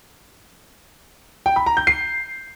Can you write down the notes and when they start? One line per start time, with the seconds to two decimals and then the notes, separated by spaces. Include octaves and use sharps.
1.46 G5
1.56 B5
1.66 A#5
1.77 G6
1.87 C7